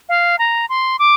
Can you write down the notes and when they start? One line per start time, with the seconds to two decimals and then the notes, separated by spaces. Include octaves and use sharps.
0.09 F5
0.39 A#5
0.69 C6
0.99 D6